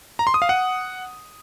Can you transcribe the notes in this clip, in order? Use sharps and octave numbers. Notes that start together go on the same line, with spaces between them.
A#5
C6
D#6
F5
F#5